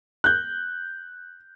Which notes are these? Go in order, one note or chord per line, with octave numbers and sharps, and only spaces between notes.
F#6 G6